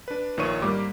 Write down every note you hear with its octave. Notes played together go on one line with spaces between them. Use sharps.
D4 B4
A#1 D#3 F4 C#5 C#6 D#7
G#2 G3 A#3 D6